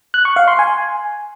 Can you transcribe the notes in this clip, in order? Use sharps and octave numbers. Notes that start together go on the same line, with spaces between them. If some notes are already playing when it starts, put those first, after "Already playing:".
F#6
C#6
F5
C6
G#5